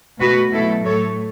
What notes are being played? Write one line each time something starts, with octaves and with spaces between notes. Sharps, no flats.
B2 A3 F#4 B4
B2 F#3 A3 E4 A4
A2 A3 A4 C#5